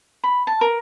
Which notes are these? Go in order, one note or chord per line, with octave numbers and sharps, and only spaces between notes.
B5
A5
A#4